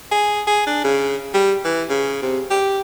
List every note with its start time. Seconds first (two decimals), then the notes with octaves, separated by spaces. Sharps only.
0.11 G#4
0.47 G#4
0.67 D4
0.84 C#3
1.34 G3
1.65 E3
1.89 C#3
2.22 C3
2.51 G4